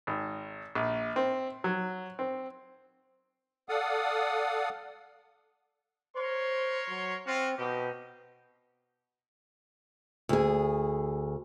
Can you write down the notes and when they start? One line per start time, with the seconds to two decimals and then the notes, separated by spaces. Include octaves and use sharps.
0.07 G#1
0.75 A#1
1.16 C4
1.64 F#3
2.19 C4
3.69 A4 D5 F5 F#5 D#6
6.16 A#4 C5 C#5 C6
6.88 F#3
7.27 C4 F4 F#4 F5
7.58 B2 D#4 G4
10.29 D2 G#4